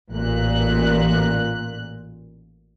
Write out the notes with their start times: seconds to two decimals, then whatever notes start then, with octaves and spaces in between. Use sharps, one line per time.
0.10 A1 A#2 F#6